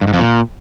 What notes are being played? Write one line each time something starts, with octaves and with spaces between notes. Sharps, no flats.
G2
G#2
F2
A#2